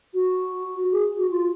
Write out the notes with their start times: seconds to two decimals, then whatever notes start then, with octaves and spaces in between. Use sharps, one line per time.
0.14 F#4
0.92 G#4
1.17 F#4
1.30 F4